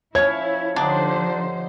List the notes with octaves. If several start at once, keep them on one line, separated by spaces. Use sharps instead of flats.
F3 C#4 E4 C#5 G#6
D3 F3 D4 D#4 G4 C5 F#5